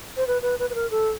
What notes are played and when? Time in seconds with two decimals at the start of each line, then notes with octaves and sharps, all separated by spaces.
0.17 C5
0.27 B4
0.42 B4
0.59 B4
0.70 B4
0.75 A#4
0.91 A4